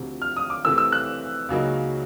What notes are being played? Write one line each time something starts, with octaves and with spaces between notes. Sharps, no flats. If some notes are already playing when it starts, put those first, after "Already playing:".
Already playing: D2 C3 F3
F6
D#6
D6
C3 E3 A3 C4 E6
E6
F#6
C#2 C#3 F#3 A#3 D#4